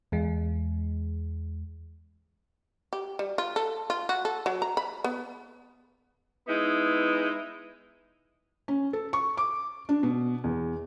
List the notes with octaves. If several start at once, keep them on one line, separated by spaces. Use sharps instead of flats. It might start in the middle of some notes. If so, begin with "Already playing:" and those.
E2 G#3
G4
G3
F4
A4
F4
F#4
A4
F#3
A#5
B5
B3
G#3 B3 D#4 E4
C#4
A4
C#6
D6
D4
B2
E2